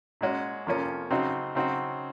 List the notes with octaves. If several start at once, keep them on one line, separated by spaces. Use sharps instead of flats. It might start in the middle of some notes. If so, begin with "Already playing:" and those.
A#2 G#3 C#4 F#4
F2 C3 F3 A#3 C#4
C#3 F#3 C4 D#4 F#4
C#3 F#3 C4 D#4 F#4